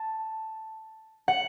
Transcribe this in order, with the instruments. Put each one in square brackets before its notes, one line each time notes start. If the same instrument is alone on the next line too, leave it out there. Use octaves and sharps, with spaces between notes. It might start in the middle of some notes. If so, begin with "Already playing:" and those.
Already playing: [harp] A5
F#5